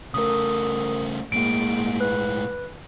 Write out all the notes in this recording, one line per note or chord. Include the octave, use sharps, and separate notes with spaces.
C#3 A3 A#4 D#6
A2 G#3 A#3 D7
B4 F#6